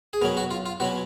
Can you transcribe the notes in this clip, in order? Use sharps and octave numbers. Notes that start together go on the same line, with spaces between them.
G#4
B2 F#3 C#4 A#4
F#4
F4
F4
B2 F#3 C#4 F#4